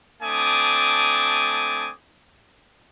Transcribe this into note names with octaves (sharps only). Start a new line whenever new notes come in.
A3 C4 D4 G#5 D6 D#6